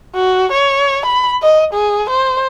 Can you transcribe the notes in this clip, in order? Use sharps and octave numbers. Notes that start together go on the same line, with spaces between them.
F#4
C#5
B5
D#5
G#4
C5